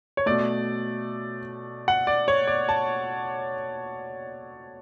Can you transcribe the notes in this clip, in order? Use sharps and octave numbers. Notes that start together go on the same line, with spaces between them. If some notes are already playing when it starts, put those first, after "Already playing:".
C#5
B2 A3 D5
F#5
D5
C#5
D5
A5